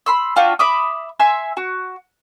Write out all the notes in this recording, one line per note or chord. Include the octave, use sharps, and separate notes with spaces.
B5 C6 E6
D4 F4 F#4 G5
E5 B5 D6 D#6
E5 G#5 C6 E6
F#4